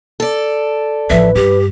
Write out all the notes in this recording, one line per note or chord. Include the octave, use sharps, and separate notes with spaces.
A4 D5
A1 F3 B4 E5
G2 G4